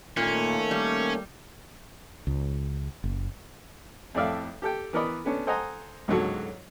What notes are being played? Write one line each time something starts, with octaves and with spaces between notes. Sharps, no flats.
A#2 D#3 A3 A#3 C#4
G3
C#2
F#1
F2 A2 D5 E5 F5
G4 A4 G5
E3 B3 A#4 D5 D#5 B5
A3 B3 C#4 D4
A4 C5 D#5 F#5 G#5 A#5
C#2 G#2 D3 F#3 F#4 A4